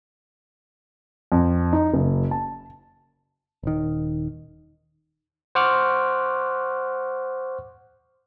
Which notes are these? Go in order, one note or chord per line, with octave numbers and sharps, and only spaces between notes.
F2
D#4
F#1
A5
D#1 D#3
C5 F#5 C#6 D6 F6 F#6